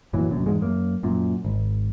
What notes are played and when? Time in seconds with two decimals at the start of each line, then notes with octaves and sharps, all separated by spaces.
0.13 F#2 A#2 E3 F#3
0.29 F1 A#1 F#2
0.46 E2 G#2 G#3
0.62 F#2 A#3
1.03 F#2 A#2
1.45 G#1